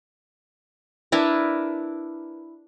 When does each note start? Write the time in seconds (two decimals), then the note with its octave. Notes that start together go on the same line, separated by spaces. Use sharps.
1.12 D4 E4 A#4 B4